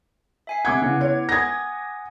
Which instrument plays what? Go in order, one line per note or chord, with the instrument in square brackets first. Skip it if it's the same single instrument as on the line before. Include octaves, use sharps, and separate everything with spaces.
[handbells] E5 G#5 C7
[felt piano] C3 D6 G#6 [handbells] F#5 F#6 C#7
[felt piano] C#3 [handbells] B3 E4
[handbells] B3 G#6 [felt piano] C#5
[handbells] F#5 G#5 D#6 [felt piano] G#6 A#6